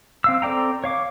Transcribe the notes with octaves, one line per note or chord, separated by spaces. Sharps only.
C4 F5 E6
C4 A4 D5 G5 A#5
C#5 F5 D6